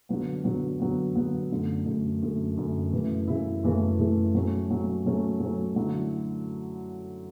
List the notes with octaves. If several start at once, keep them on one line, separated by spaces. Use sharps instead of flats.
D3 F#3 B3
D3 F#3 B3
D3 F#3 B3
D3 F#3 B3
F#2 D3 A3
F#2 D3 A3
F#2 D3 A3
F#2 D3 A3
F#2 C#3 E3 A3 E4
F#2 C#3 E3 A3 E4
F#2 C#3 E3 A3 E4
F#2 C#3 E3 A3 E4
F#3 A3 C#4
F#3 A3 C#4
F#3 A3 C#4
F#3 A3 C#4
D3 F#3 A3 E4